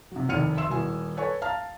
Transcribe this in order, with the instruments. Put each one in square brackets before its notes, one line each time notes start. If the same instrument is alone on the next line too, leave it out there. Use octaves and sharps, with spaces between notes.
[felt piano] C3 F#3
F1 D#2 F6 C#7 D#7
E5 C6 E6 E7
D#1 E4 F#4 G#5
A4 B4 C#5 G#5 C#6
F5 A5 A#5 F6